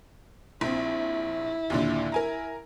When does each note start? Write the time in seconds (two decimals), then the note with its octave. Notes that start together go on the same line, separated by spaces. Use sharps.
0.61 A#1 C4 E4
1.70 D#2 A#2 D3
2.12 A#4 G#5 A#5